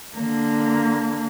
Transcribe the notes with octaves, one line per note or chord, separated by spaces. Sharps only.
D3 A#3